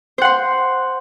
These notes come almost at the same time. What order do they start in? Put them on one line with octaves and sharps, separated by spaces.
C5 F#5 C6